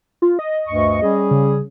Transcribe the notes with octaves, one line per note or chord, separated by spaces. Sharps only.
F4
D#5
D2 G2 C#6
G3 C#4 G#4
C#3